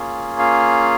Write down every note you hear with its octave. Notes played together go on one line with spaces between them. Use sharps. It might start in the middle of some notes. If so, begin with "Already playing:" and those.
Already playing: A#3 C#4 F4 G#4
F5